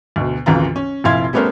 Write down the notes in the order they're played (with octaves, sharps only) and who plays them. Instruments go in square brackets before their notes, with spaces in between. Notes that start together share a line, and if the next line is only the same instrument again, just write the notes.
[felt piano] D2 B2
G#1 D2 C#3 E3 F4 A#5
C#4
F1 A#1 E4 F5 C6 G#6
G3 A3 B3 C#4 A#4 C5